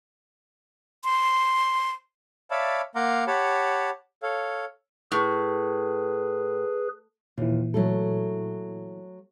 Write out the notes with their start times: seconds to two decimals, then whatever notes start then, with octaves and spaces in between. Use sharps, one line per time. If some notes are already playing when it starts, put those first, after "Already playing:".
1.04 C6
2.51 C#5 D5 E5 F5 A5 B5
2.95 A#3 F5 F#5 A#5 C6 D6
3.27 G4 C#5 F#5 A5 B5
4.23 A4 C#5 F5
5.12 A2 G#4 B4
7.38 D#2 A#2 E3
7.74 F#3 A3 A4